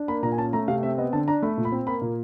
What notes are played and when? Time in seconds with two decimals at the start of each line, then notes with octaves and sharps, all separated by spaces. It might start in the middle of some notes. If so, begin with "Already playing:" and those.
Already playing: D4
0.08 A#3 B5
0.23 A#2 A#5
0.32 G#5
0.37 C#4 A5
0.53 A3 A#5
0.68 C3 F5
0.83 C4 E5
0.98 B3 D#5
1.13 D3 A5
1.28 D4 A#5
1.42 A3 B5
1.57 A#2
1.65 B5
1.72 C4
1.87 A#3 B5
2.02 A#2